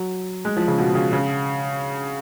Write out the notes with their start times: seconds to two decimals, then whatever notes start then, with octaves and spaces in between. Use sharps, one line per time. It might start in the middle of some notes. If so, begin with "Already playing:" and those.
Already playing: F#3
0.45 G#3
0.57 F3
0.68 C#3
0.78 B2
0.95 C#3
1.13 C#3